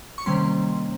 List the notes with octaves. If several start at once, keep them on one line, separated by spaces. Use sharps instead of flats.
C#6
C3 D#3 G3 A#3 C#4 C6